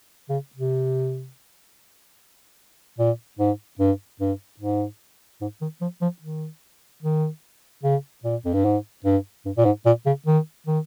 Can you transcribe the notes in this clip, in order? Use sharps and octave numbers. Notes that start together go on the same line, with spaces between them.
C#3
C3
A#2
G#2
G2
G2
G#2
G#2
D#3
F3
F3
D#3
D#3
C#3
A#2
F2
G2
G#2
G2
G2
A#2
G#2
A#2
C#3
D#3
D#3